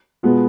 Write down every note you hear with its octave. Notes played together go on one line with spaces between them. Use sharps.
B2 G#3 B3 F4